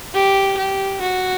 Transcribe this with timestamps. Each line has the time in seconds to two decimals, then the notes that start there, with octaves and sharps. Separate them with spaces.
0.14 G4
0.57 G4
1.01 F#4